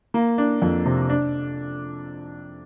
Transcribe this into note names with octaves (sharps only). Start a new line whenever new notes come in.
A#3
D4
F2
C3
D4